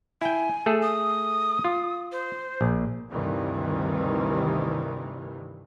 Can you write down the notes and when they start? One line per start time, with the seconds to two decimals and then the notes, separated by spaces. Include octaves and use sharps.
0.21 E4 G5 G#5
0.66 A3 G#4 A4
0.82 D#6
1.64 F4
2.12 C5
2.61 A#1
3.11 D2 G2 C3 D#3 E3